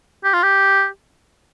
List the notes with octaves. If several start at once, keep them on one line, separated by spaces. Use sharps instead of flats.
G4
F4
G4